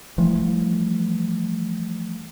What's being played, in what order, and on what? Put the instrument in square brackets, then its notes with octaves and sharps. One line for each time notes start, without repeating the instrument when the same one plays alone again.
[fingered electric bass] E3 F3 G3 A3